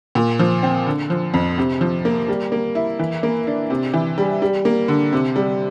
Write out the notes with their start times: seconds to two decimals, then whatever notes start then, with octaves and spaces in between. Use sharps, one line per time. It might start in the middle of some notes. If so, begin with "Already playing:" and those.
0.15 A#2
0.39 F3
0.63 C4
0.86 D3
1.10 F3
1.34 F2
1.58 C3
1.81 F3
2.05 A#3
2.28 G3
2.52 A#3
2.75 E4
2.99 E3
3.23 A#3
3.47 D4
3.70 C3
3.94 E3
4.18 G3
4.42 G3
4.65 A#3
4.88 D3
5.12 C3
5.36 G3